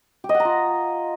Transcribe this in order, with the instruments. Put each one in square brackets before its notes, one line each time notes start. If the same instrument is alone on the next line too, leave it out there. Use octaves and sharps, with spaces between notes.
[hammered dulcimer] G4
D#5
F#5
A#5
F4